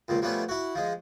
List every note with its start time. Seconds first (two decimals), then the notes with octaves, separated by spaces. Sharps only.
0.08 C#2 A#2 F3
0.22 F3 G3 A3 B3 C#4
0.49 E4 F#4
0.75 F3 G#3